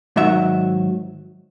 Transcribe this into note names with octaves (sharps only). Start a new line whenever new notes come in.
G#2 D#3 F#3 E5